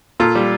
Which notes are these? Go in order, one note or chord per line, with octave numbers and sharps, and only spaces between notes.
A#2 F4 A4
G3